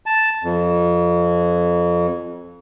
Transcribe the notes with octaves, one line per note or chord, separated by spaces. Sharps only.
A5
F2